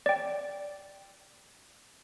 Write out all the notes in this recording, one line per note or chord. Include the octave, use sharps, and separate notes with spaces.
D5 G5